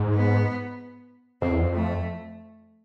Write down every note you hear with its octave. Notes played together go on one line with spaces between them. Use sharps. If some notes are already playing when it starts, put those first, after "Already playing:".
Already playing: G#2
B3
F2 C4
E2
F2
A3